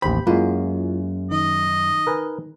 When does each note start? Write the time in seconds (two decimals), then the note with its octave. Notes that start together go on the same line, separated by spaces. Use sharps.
0.02 A1 D#2 G4 C5 G5 B5
0.27 F#2 G#3 A#3 E4 F4
1.31 D#3 D#4 D#5
2.07 A#4 B4 G#5